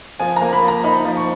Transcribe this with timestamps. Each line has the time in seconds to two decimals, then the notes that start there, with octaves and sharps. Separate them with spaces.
0.19 F3 G#5
0.36 A#5
0.41 A#3
0.53 B5
0.62 F3
0.68 A#5
0.84 D#4 B5
1.05 F3
1.16 C#6